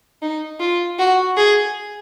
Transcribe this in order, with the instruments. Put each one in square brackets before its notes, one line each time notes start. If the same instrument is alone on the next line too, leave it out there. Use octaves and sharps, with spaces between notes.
[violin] D#4
F4
F#4
G#4